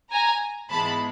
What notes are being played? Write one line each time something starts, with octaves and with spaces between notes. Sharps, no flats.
G#5 A#5
G#2 E3 G#3 B3 A5 B5